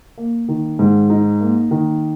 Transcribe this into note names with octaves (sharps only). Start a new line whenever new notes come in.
A#3
D#3
G#2
D#4
A#3
D#3